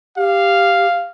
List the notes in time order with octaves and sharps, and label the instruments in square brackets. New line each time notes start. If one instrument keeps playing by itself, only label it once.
[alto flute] G4 [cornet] F5